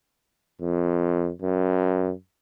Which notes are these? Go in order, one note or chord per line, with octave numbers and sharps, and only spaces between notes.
F2
F#2